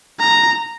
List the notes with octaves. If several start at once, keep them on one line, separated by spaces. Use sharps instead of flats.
A#5